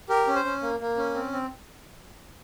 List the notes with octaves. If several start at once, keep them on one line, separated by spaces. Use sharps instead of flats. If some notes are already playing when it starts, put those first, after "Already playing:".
G4 A#4
C#4
C5
C#4
A#3
A#3
C#4
C4
C4